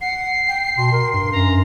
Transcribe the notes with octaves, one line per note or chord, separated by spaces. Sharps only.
F#5 C7
G5
B2 C6
A#4
G2
F#2 A#5